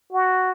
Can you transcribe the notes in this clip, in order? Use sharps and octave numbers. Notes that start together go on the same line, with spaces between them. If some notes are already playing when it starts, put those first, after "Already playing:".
F#4